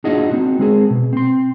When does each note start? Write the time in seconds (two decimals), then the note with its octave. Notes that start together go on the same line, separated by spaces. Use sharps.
0.04 D4 D#4 F4 F#4 G#4 D#5
0.30 C4 D#4 F#4
0.59 G#3 C4 G#4
0.90 B2
1.13 C4 C6